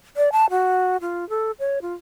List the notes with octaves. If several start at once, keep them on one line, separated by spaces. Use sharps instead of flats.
D5
A5
F#4
F4
A4
C#5
F4